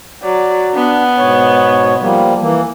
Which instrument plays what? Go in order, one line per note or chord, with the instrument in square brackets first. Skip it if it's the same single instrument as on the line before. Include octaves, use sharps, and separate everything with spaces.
[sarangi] F#3 [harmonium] D5
[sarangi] B3 [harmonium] D4
[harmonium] G#2 B2 C#5
F3 G3 A#3
E3 A#3